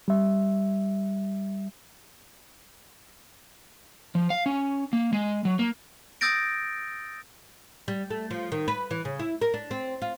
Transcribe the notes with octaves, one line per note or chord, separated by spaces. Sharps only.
G3 E5
F3
F5
C#4
A#3
G#3
F#3
A#3
D#6 E6 G6 A6 A#6 D7
G3
A3
F3
D#3
B4
E3
C#3
E4
A#4
D4
C4
F4